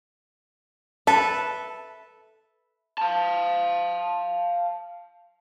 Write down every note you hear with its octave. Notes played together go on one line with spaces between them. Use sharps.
A4 B4 E5 A5
F5 A5